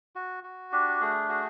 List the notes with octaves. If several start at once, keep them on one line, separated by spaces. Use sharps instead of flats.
F#4
F#4
D4 G4
A3 G#4
F#4 G#4